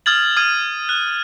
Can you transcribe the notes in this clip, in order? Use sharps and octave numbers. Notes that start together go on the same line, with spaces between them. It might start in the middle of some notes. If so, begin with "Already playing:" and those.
D#6 F6 G#6 A6 F#7
D#6 F6 G#6 D#7
F#6